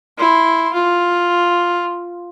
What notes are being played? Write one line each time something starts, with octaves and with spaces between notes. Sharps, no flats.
E4 C6
F4